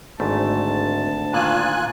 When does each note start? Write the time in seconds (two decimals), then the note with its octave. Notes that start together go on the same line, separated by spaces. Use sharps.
0.20 G#1 D2 G#2 A3 A5
1.33 A#2 D#3 F4 G#5 F#6